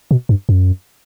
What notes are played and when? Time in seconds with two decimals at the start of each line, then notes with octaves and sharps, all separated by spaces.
0.11 B2
0.29 G2
0.49 F#2